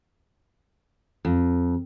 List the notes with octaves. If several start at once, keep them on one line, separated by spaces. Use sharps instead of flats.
F2